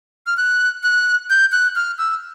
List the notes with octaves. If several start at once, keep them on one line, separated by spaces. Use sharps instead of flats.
F6
F#6
F#6
G6
F#6
F6
E6